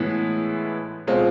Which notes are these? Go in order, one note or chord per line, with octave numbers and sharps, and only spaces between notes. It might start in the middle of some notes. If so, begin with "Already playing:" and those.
Already playing: A2 E3 G#3 B3 E4
B2 G#3 C4 F4